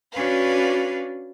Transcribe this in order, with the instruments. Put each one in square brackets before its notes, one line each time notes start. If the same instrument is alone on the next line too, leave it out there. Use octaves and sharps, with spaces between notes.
[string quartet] C#4 D4 F#4 B4 F5